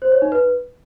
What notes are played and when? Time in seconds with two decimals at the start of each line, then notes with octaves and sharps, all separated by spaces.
0.02 C5
0.12 C#5
0.22 D#4
0.32 B4